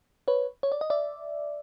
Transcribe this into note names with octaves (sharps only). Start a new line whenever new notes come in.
B4 C#5
C#5
D5
D#5
D5 E5